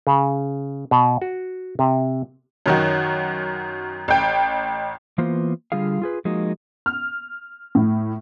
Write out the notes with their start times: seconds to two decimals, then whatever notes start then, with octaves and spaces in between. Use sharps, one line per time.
0.07 C#3
0.91 B2
1.22 F#4
1.79 C3
2.66 F#2 D#3 F#4
4.08 A1 G5
5.18 E3 A#3 B3 F4 C5
5.72 D3 G3 F4 G#4 F5
6.02 F4 G#4 B4
6.25 F3 G#3 A#3 D#4 F#4
6.86 F6
7.75 A2